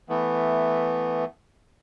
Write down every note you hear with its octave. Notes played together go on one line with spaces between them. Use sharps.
E3 A3 B3